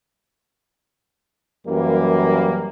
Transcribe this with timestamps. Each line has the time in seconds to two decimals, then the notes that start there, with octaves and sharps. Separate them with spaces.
1.67 F#2 E3 G3 A#3